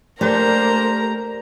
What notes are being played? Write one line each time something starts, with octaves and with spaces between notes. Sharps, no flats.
A3 A#3 D4 G4 A#4 C5 D5 A#5